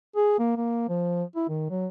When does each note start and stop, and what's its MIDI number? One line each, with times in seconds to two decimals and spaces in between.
0.16 0.35 68
0.39 0.54 58
0.57 0.88 58
0.89 1.24 53
1.36 1.46 64
1.49 1.70 51
1.71 1.87 54